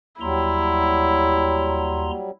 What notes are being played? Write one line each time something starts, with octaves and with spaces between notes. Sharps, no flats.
D#2 F#3 G3 E4 A#5 C6